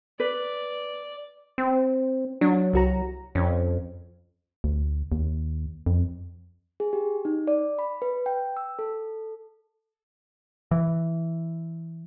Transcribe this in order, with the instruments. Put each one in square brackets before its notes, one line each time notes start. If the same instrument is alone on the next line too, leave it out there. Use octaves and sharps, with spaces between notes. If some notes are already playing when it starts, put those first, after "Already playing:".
[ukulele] B4 [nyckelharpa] D5
[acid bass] C4
[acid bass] F#3 [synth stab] D4
[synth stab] C2 F#4 A#5
[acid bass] F2 [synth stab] C#4
[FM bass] D2
D#2
F2
[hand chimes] G#4
G4
D#4
D5
B5
B4
G5
E6
A4
[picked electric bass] E3